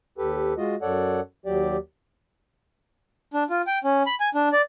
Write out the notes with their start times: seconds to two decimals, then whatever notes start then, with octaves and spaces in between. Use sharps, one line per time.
0.18 D#2 G4 A4 B4
0.58 G#3 F4 F#4 D#5
0.82 F#2 A4 C#5 D5 F#5
1.46 D#2 F#3 G4 D5
3.34 D4
3.50 F4
3.67 G5
3.84 C#4
4.06 B5
4.20 G#5
4.35 D4
4.52 D5